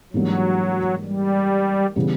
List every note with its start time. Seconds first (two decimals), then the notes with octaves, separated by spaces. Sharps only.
0.13 G#2 E3 F#3 G3 A#3 D4
1.04 G3
1.96 C#3 E3 G3 B3